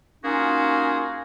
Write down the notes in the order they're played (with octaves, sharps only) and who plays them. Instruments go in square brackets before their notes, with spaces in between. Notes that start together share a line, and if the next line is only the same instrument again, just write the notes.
[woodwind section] A#3 C#4 D#4 F4 F#4 G#4